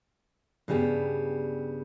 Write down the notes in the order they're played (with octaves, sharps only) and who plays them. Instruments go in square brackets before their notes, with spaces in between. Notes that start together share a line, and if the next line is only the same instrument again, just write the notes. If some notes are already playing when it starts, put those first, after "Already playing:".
[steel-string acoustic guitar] G2 C#3 G3 B3